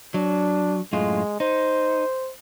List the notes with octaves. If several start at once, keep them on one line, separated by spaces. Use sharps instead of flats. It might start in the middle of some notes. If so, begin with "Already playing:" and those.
F#3 D4
F#2 A2 G#3 F4
D#4 C5